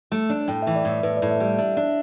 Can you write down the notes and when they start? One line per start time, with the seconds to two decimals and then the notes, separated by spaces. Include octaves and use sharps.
0.12 A3
0.30 D4
0.48 A2 G5
0.62 E5
0.67 E3
0.76 D5
0.85 A2 E5
1.03 A2 B4
1.17 D5
1.22 A2
1.31 E5
1.40 G3
1.45 D5
1.58 D4 E5
1.77 D4 E5